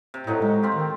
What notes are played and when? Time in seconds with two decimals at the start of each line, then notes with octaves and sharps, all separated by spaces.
0.14 C3
0.27 A2 F#3 A3 D#4
0.42 G#3
0.63 C4 F4 G4
0.75 D#3